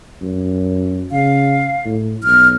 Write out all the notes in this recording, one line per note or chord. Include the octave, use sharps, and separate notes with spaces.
F#2
C#3 F5
A2
B1 F6